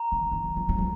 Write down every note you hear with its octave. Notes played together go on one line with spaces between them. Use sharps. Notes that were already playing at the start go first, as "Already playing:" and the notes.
Already playing: A#5
D3
D#3
F#3
F3
F#3
F3